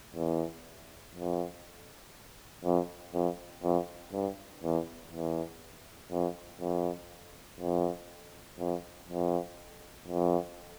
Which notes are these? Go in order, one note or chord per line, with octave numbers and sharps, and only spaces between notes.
E2
F2
F2
F2
F2
G2
E2
E2
F2
F2
F2
F2
F2
F2